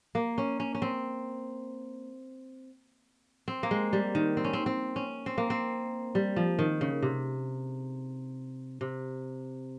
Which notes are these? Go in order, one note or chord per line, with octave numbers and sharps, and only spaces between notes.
A#3
C#4
C#4
C#4
C4
C4
A#3
G#3
G3
D#3
C4
C#4
C4
C4
C#4
C4
A#3
C4
G3
F3
D#3
C#3
C3
C3